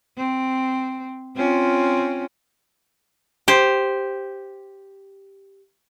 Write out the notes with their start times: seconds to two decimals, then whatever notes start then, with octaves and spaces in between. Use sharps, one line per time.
0.17 C4
1.36 C4 C#4 F4
3.48 G4 C5